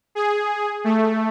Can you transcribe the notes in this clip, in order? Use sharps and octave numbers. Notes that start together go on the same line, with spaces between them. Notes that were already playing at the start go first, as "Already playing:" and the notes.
G#4
A3